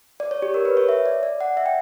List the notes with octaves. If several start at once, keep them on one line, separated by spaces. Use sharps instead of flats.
D5
C#5
G4
A#4
B4
C#5
E5
D5
D5
F#5
E5
G5